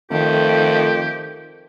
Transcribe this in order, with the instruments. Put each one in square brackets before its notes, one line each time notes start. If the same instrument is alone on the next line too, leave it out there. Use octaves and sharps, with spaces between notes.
[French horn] F2 [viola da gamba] D#3 [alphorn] A3 [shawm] G4